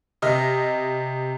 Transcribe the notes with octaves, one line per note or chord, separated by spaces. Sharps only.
C3 D#5 E5 F6